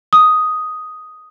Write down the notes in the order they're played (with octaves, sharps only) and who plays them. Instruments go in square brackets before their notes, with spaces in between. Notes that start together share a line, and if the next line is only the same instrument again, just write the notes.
[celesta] D#6